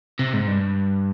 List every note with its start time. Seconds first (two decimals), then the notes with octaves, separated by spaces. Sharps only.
0.19 C3
0.33 G#2
0.47 G2